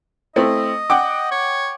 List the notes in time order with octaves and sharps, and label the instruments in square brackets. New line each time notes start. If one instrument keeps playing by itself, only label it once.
[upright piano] A3 C4 E4 [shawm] D#5
[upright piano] F#5 G5 D6
[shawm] C#5